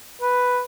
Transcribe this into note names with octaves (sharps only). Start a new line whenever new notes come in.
B4